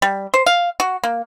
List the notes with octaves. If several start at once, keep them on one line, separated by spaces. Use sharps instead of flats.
G3
C5
F5
F#4
A#3